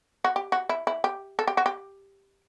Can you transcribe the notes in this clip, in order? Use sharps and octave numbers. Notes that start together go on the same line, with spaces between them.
F#4
G4
F#4
E4
E4
G4
A4
G4
F#4
G4